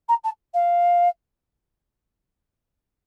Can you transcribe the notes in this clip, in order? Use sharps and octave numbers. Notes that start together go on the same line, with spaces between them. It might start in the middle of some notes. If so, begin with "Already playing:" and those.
A#5
A5
F5